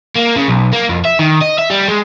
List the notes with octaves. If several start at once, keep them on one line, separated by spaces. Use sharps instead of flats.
A#3
C#3
B1
A#3
F2
E5
D#3
D#5
E5
G3
G#3